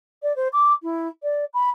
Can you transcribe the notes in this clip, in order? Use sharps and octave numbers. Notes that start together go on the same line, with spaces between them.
D5
C5
D6
E4
D5
B5